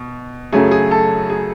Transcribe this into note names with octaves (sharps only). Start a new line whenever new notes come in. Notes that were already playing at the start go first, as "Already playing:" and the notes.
Already playing: B2
F#2 C#3 F#3 A3 G#4
G#4
A4
G#4